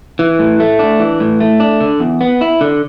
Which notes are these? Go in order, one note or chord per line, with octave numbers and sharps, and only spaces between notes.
E3
A2
A3
D4
E3
A2
A3
D4
D3
E2
B3
E4
D3